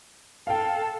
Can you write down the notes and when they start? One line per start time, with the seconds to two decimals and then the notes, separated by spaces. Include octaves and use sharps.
0.47 A4 F5 G5